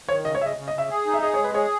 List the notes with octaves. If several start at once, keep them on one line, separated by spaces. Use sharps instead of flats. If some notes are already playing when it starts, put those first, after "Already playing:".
D#3 C#5
C#3 D#5
C#5
C#3 E5
D#5
C#3
D#5
C#3 E5
G#4
D#4
E5
G#4 D#5
C#5
G#3
B4
G#4 C#5